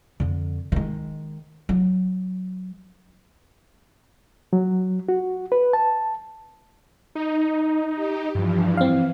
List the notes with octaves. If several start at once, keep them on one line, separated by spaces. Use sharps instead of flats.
F2 D3
D#3 G#3
F#3
F#3
F#4
B4
A5
D#4
G4
G2 E3 F3
E3 C4 F5